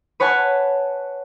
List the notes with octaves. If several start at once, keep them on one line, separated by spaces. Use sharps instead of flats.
B4 C#5 F#5 G#5 A5